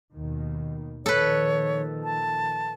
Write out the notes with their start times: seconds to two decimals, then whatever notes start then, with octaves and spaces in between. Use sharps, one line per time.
0.12 D#2 B2 D#3
1.06 A#2 D#3 F3 A4 B4 C#5
2.04 A5